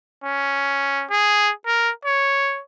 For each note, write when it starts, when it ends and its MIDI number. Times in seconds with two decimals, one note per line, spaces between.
0.24 1.05 61
1.10 1.51 68
1.67 1.90 70
2.05 2.61 73